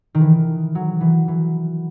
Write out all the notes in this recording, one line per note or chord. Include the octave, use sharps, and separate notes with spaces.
D#3
E3
F#3
E3
E3